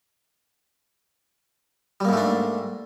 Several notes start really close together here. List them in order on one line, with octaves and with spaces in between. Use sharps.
G3 A#3 G#2 A3 D4